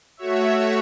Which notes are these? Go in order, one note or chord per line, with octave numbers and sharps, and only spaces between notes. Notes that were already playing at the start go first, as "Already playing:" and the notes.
A3 F#4 C#5 E5